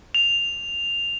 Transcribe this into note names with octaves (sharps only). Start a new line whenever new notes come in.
F7